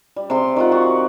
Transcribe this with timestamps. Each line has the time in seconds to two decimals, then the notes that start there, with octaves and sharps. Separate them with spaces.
0.16 G3
0.30 C3 C6
0.56 D#3 F4 F#5
0.72 F#4